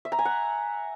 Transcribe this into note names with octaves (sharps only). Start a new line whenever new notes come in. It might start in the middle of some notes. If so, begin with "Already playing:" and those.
E5
A#5
G#5
F#5